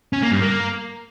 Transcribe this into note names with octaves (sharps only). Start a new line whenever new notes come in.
C#4
A#3
G2
A#3